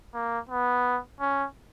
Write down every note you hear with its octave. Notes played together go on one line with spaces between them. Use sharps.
A#3
B3
C#4